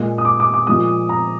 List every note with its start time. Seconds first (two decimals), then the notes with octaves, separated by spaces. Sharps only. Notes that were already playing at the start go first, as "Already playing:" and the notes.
Already playing: A#2 G#3
0.18 D#6
0.25 D6
0.40 D6
0.54 D6
0.67 A#2 F3 G#3 D#6
1.09 A#5